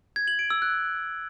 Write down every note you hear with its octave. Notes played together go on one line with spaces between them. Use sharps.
G#6
F#7
D7
E6
F#6